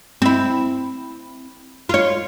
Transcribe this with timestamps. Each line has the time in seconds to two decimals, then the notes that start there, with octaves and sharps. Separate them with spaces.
0.22 C4 E4
1.89 F4 C#5